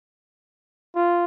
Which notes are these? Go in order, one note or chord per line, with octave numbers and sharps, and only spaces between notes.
F4